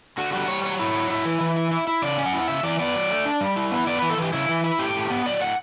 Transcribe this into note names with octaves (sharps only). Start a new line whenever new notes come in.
D3 F#4
G3 F#4
G3 C#5
F#3 C#5
E4
F#3
E4
E3
E3
E4
E4
E4
C#3 D5
C#4
F#5
E4
C#3 E5
E3 D5
B3 D5
F#3
A3
D4
G3
E4
B3
B3 D5
E3 B4
A4
E3 G4
C#3 E4
E3
E4
A2 G4
A2
B3
F#3 D5
A2 F#5